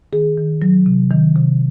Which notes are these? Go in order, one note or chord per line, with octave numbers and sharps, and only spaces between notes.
D#3 G#4
D#3
F#3
C3
D#3
C3